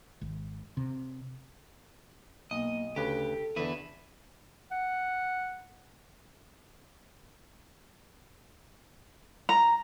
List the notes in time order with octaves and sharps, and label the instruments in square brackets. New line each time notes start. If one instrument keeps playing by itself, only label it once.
[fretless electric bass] G#1
C3
[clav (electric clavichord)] B1 [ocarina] A#3 [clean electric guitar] D#5
[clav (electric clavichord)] D2 C#3 B4 [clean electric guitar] G4 [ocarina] A4
[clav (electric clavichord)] E2 D3 [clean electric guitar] E4 B4
[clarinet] F#5
[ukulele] A#5